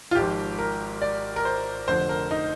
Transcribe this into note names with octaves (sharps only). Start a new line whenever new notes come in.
F4
G#1 G#2 F3 G4
A#4
D5
A#4
C5
F1 F2 D3 F3 C5
A#4
D#4